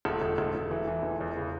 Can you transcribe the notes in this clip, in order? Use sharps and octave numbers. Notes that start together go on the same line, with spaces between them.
E1 A4
E1
E1
E1
E3
E3
E1
E2
C#3